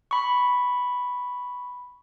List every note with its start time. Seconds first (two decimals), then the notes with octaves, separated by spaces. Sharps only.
0.11 B5 C#6